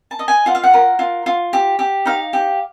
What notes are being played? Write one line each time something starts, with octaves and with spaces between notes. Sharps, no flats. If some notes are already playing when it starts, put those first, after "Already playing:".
A5
D#5
G#5
F4 F#5
F5
F#5
A#4
F4
F4
G4
G4
D#4 F5
G4